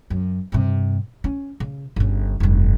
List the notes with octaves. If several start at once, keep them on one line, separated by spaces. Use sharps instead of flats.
F#2
G2 C3
C#4
C#3
G1 C#3
F1 G2